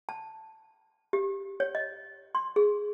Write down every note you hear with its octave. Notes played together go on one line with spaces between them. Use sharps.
A5
G4
C#5
D#5
C6
G#4